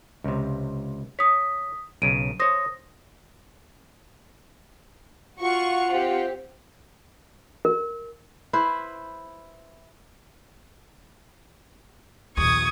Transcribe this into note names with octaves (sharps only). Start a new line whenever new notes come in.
C#2 C3
C#5 D#6 B6
B1 C#3 D7 D#7
C5 C#5 D#6 A#6
F4 F#4 F5 F#5 C#6
C4 G4
A#4
E4 B4 C5
A#1 D#2 C#6 D#6 G#6